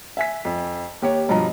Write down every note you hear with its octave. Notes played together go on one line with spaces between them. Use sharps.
E5 G#5 B6
F2
D#2 G4 C#5
G2 B2 F3 D#5 A#5